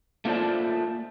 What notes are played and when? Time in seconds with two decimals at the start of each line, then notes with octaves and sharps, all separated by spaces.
0.25 A3 A#3 F4 C5 D5 A5